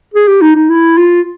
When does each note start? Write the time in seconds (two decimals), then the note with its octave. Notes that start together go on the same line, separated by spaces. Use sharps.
0.14 G#4
0.28 G4
0.41 D#4
0.56 D#4
0.70 E4
0.97 F4